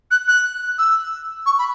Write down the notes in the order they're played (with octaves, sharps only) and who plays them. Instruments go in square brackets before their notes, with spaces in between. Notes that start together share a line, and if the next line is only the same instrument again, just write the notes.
[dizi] F#6
F#6
E6
C#6
B5